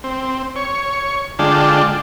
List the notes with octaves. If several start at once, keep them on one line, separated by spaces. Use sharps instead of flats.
C4
C#5
D3 G#3 D4 F4 G5 A5